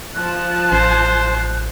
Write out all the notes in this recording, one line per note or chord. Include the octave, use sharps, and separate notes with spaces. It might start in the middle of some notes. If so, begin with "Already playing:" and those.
F3 A5 F#6
A1 C5